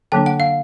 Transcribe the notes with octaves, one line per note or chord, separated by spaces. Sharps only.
D3 F#3 A#3 D4 G5
F#5
F5